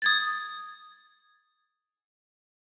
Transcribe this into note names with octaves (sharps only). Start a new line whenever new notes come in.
D#6 G#6 A6